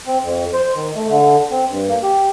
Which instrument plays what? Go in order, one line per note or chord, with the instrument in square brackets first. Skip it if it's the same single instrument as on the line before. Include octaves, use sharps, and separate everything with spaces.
[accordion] C4
F2
C5
D#3
A3
D3
C4
G2
A#3
G4